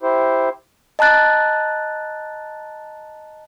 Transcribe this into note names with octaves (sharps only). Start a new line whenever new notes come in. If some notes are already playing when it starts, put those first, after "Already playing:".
E4 G4 C5
D#5 A5 A#5 F#6 A6